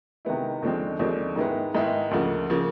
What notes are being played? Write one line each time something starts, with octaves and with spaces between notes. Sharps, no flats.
C3 D#3 G#3 B3 E4
D#2 D3 F3 G#3 C4
D#2 D3 F3 G#3 C4
G#2 D#3 G#3 B3 E4
G#2 D#3 G#3 B3 E4
D2 C#3 F3 A#3
C#3 F3 A#3